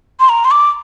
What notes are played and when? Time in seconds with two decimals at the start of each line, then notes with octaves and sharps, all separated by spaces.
0.20 C6
0.29 A#5
0.45 C6
0.51 D6